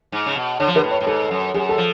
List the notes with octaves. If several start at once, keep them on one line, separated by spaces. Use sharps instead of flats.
G#2
C#3
B2
D3 C#5
F3
D3 B4
A2
C#5
A2
G#2 A4
F#2
F#2 G#4
A4
F3